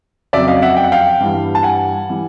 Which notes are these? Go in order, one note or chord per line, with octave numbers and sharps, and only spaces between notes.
F2 C#3 F#3 D5 E5
D#5 F5
E5 F#5
G5
F#5
F5 G5
G2 E3 G3
A5
F#5 G#5
E3 G3